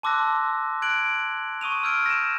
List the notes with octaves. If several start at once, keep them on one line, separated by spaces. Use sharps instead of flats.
A5 C6 D6 E6 F#6 A#6
F#6 G#6 D7 F#7
C#6 D#6 D#7 F7
E6 F6 G6 G#6 D7
A#6 E7